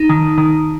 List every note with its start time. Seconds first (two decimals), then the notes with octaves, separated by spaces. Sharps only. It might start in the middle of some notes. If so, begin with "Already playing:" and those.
Already playing: D#4
0.09 D#3
0.38 D#3